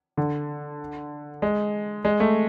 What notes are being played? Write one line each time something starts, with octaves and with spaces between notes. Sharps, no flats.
D3
G#3
G#3
A3